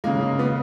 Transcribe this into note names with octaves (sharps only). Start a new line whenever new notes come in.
C#3 G#3 A#3
A#3
B3